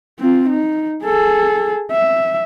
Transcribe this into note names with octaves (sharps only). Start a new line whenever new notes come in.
C4 F4
D#4
G#4 A4
E5